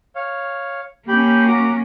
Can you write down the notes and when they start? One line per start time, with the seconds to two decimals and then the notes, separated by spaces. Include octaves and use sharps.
0.16 C#5 F5
1.08 A#3 C#4 G4 G5 B5
1.48 F#4 A#5 D6